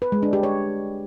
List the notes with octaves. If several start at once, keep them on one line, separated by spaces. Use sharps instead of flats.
B4
G#3
D4
G4
C#5